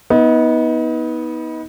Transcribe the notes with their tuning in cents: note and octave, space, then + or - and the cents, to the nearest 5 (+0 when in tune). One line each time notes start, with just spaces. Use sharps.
B3 -15 D#4 +30